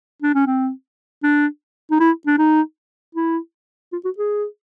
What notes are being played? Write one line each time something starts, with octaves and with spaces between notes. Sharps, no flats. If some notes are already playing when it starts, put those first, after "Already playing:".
D4
C#4
C4
D4
D#4
E4
D4
D#4
E4
F4
F#4
G#4